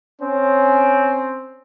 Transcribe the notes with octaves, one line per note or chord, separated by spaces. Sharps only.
C4 C#4